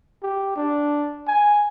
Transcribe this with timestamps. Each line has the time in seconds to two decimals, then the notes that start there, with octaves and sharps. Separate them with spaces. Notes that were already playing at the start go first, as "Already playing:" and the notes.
0.23 G4
0.56 D4
1.27 G#5